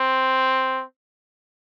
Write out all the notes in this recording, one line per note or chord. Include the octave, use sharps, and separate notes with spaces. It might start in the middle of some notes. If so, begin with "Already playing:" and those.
Already playing: C4